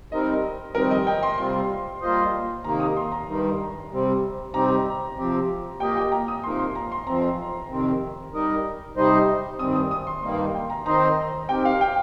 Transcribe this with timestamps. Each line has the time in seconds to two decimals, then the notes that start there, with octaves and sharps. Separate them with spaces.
0.12 G3 C4 D#4 A#4 D#5
0.75 F2 D#3 G3 C4 D#4 A#4
0.91 D#5
1.07 G5
1.23 C6
1.38 C3 G3 C4 F4 C6
2.01 G3 A#3 F4 C5 D#5
2.64 C3 D#3 A#3 D#4 A#5
2.80 D#6
2.97 C6
3.12 A#5
3.28 G2 D#3 G3 D#4
3.91 C3 G3 C4
4.54 C3 G3 C4 D#4 G4 A#5
5.17 C3 F3 C4 G4
5.80 A#2 A#3 G4 D#5 G5
5.96 G5
6.12 A#5
6.28 D#6
6.43 C3 F3 A#3 D#4 A#4 C6
6.59 C6
6.75 A#5
6.92 C6
7.07 F2 F3 C4 A#5
7.70 F2 C3 D#3 C4
8.33 G3 D#4 A#4 D#5
8.97 C3 G3 D#4 C5 D#5
9.59 G2 D#3 G3 C4 D#6
9.75 D#6
9.91 D#6
10.07 C6
10.23 G2 D#3 G3 A#3 D#4 C6
10.54 G5
10.70 A#5
10.86 D#3 C4 D#4 C5 D#5 A#5
11.49 D#3 C4 G4 A#4 G5
11.65 F5
11.81 G5